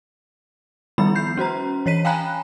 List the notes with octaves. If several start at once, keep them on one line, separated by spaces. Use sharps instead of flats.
D#3 F3 G3 B3 E4 B5
G6 C7
C#4 F#4 C5 A#5
E3 C#5 B6 D#7
F5 G5 G#5 A#5 B5 F#6